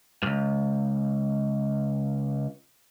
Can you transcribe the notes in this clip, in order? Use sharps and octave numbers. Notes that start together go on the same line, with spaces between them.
C#2 G2